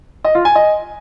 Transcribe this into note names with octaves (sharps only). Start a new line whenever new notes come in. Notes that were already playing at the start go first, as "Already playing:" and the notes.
D#5
F4
G#5
D#5